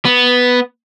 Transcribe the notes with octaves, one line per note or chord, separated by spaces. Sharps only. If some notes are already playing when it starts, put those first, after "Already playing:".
B3